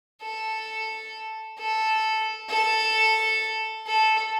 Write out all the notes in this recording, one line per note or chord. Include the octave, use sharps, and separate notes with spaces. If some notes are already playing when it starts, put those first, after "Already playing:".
A4
A4
A4
A4